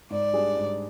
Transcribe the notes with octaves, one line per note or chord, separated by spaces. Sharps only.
G#2 D5
G3 D4 G#4
G#2